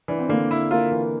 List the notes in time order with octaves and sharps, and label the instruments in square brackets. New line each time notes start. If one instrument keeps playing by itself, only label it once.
[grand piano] E3 [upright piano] D4
[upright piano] C4
[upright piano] D3 D4 [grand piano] A#3
[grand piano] E4
[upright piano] A#3 A#4 [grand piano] F4
[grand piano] E3